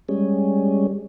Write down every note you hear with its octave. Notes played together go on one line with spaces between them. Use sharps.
G3 G#3 C#4